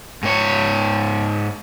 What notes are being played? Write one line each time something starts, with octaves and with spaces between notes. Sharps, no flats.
G#2 C#5